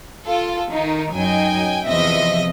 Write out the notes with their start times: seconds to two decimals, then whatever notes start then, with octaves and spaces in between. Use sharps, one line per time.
0.24 F4 A4
0.70 D#3 D#4
1.13 F#2 F#3 D#4 G5 G#5
1.87 E2 C3 F3 D#5 E5 A#6